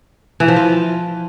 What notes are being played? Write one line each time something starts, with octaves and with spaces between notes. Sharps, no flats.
E3
F3
F4